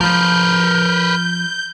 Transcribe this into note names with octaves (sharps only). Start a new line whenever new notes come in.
F3 A#4 B4 F6 G6